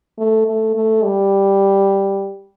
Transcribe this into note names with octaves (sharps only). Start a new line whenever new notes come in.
A3
A3
A3
G3